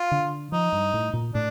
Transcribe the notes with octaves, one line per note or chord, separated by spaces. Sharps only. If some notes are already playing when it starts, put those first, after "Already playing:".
Already playing: F4
D3
F3 D#4
G2
A2
A#2
A2 D4